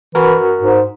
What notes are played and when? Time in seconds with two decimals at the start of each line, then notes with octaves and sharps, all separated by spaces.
0.15 E3 F#4 A#4
0.62 G#2